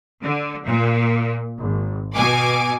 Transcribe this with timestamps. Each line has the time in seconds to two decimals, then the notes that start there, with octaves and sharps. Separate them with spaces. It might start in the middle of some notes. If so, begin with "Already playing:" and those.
0.21 D3
0.65 A#2
1.58 G#1
2.15 B2 G#5 D6